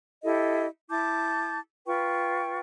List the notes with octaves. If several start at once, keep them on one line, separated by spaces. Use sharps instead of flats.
E4 G4 A4 D#5
E4 A5 D6 G6
F4 B4 G5 C#6